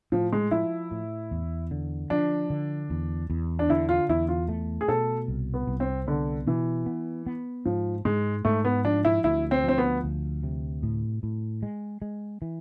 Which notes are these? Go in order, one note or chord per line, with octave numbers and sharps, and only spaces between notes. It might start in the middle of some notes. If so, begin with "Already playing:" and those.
A2 F3
G#3
F3 E4
A2
E2
D3
F3 D4
D3
E2
E2
D4
D3 E4
F4
E2 E4
F4
A3
G#4
B2 A4
C2
B3
C2
C4
D3 B3
B2 E3
B3
B3
G#2 F3
G#2 G#3
G#2 A3
B3
F3 D4
E4
D2 E4
C4
F3 C4
B3
D2
C3
A2
A2
G#3
G#3
E3